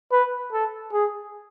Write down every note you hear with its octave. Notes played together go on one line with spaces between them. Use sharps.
B4
A4
G#4